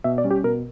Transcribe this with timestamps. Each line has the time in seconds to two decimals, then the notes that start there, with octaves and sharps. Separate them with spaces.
0.04 B2 E5
0.18 D5
0.24 G3 C#4
0.31 G4
0.44 B2 A#4